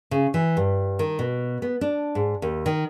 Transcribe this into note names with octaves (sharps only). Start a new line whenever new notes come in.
C#3
E3
G2
D#3
B2
B3
D4
G#2
D#2
D#3